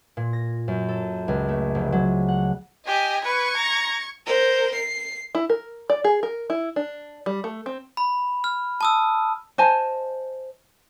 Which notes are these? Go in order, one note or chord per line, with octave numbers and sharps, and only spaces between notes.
A#2
A#6
F#2
A4
C#2
A3
F1
F#3
F#5
G4 D#5 G#5
B4 C#6 G#6
A#5
A#4 C5
C7
E4
A#4
D5
G#4
A#4
E4
D4
G3
A3
C4
B5
F6
A5 D#6 E6
C5 D#5 G#5 A5